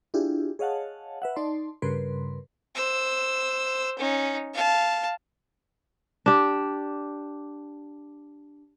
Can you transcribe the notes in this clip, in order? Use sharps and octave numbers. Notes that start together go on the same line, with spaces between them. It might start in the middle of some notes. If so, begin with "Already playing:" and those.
D4 E4 F4 G4 G#4
G#4 C#5 D#5 F5 F#5 A5
B4 E5 F#5
D#4 D5 A5 C6
G2 C#3 A#4 B4 C6
C5 E6
C#4 D#4
F5 A5
D4 G4